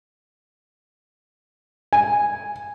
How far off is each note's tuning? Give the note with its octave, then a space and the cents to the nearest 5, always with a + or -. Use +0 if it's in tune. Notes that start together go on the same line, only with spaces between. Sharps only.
G#5 -10